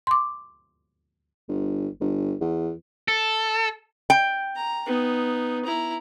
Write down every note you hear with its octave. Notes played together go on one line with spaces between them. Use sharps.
C6 D6
G1
G1
E2
A4
G5
A#5
B3 D#4
E4 A#5